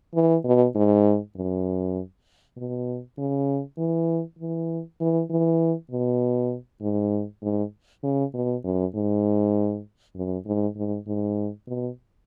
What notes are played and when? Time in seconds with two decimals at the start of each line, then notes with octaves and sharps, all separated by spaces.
0.15 E3
0.44 B2
0.75 G#2
1.36 F#2
2.56 B2
3.18 C#3
3.78 E3
4.39 E3
5.00 E3
5.30 E3
5.91 B2
6.81 G#2
7.42 G#2
8.03 C#3
8.34 B2
8.64 F#2
8.95 G#2
10.16 F#2
10.46 G#2
10.76 G#2
11.07 G#2
11.67 B2